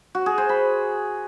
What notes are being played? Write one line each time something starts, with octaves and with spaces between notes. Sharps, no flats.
F#4
G#4
C5
B5